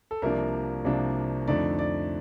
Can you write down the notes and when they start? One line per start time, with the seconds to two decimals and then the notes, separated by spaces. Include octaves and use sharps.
0.11 A4
0.22 C2 C3 F3 A#3 D4 A#4
0.85 C2 C3 F3 A#3 D4
1.48 F2 D3 A3 D#4 D5
1.79 D5